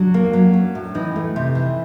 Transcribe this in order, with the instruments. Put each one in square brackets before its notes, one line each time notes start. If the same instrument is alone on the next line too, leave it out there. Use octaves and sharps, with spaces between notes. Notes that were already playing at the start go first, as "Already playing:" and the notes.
Already playing: [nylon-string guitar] F#3 D4
A#3
F#3
C#4
A2
E3 D#4
A3
C3
E3